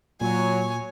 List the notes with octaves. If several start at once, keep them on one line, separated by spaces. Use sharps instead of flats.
A#2 F#3 C#5 G#5